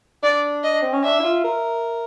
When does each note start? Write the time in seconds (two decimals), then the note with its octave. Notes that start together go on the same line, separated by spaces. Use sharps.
0.23 D4 D5
0.63 D#5
0.82 C4
0.93 C#4
1.04 D4 E5
1.20 E4
1.24 F4
1.44 A#4